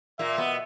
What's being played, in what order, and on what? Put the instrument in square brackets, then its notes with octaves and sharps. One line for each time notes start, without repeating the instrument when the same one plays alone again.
[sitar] A#2 A#3 [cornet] E5
[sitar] B2 B3